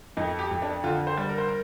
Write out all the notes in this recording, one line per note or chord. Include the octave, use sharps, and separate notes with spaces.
F2 D#4
G4
F2
D4
D3 F4
C5
G3
A#4
C5
A#4